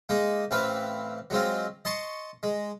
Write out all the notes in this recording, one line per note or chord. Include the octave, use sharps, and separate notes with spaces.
G#3 A#3 D#4
A1 E3 C4 B4 F5
F#3 G#3 C4 F4
D#5 A5 C6 C#6
G#3